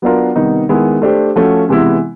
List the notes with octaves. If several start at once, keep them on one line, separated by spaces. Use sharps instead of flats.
F#3 B3 D4 F4 A#4
C3 D#3 G3 B3 D#4
D#3 G#3 B3 E4 G#4
A3 D4 G4 C5
F3 A3 C#4 F#4
C3 E3 G#3 B3 E4